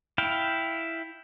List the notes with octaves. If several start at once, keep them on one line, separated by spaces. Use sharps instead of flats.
E4 F5 G5